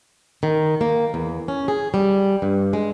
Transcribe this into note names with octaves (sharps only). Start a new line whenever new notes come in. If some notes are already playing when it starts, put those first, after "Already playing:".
D#3
A#3
E2
C#4
G#4
G3
G2
G#3